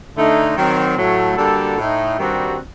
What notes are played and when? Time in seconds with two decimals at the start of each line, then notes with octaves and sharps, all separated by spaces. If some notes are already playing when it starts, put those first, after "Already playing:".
0.16 D3 A3 D#4
0.56 D#3 F#3 C4
0.97 A2 F#3 A3
1.37 D3 G3 A#3 F#4 A4
1.77 A2 A3 D#4
2.18 G2 D#3 G3 C4 F#4